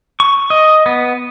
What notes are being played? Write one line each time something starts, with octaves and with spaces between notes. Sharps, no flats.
C#6
D#5
B3